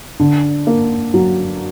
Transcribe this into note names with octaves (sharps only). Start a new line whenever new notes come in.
D3
A#3
F#3